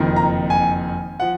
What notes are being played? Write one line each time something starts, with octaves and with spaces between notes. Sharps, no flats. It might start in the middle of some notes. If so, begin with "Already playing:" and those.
Already playing: F#1 F2 D#3
A#5
G#5
F3 F#5